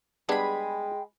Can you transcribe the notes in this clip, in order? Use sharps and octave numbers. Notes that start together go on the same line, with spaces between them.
G3 G#3 B3 D4 G#4 G5 B5